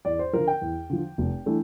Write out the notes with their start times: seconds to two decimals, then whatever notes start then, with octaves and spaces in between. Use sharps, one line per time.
0.05 E2 D5
0.19 C5
0.33 D3 F3 A#4
0.47 G5
0.62 E2
0.90 D3 F3
1.18 F1
1.46 E3 A3 D4